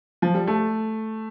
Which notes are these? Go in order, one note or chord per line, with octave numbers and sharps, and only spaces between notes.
F3
G3
A3